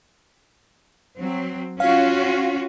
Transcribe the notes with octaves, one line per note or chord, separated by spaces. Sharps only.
F#3 C4
C#4 F4 F#4 F5